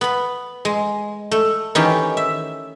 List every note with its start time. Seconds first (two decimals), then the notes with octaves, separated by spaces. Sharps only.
0.01 B3 B5
0.65 G#3
1.31 A3
1.75 D#3 E3 C#4 D#4 G4
2.17 E5